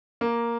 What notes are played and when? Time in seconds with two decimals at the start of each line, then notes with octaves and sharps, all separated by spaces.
0.21 A#3 A#4